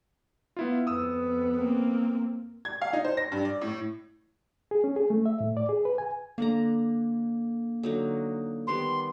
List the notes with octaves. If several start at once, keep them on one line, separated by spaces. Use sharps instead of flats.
B3 E4 F4
F2 B3 D#6 E6
A#3 C4
G#6
F5
D#4
C5
A#6
G2
D5
A2
G#4
C#4
G#4
A3
E5
A2
D5
G#4
B4
G#5
D3 A#3 D4 A#5
D3 F#3 D#4
D#3 G3 B3 C6